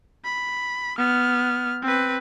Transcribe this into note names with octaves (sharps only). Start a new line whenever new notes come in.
B5
B3 F6
C4 B4